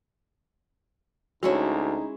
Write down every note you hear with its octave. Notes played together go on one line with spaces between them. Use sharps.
D2 G#3 C#4 D#4 E4 F#4 C#5